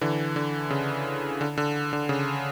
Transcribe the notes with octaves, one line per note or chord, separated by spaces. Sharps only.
D3 E3
D3
C#3
D3
D3
D3
C#3